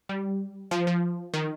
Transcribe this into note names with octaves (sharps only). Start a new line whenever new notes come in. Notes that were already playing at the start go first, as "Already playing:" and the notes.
G3
F3
F3
D#3